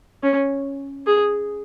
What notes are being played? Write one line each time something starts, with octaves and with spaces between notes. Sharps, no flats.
C#4
G#4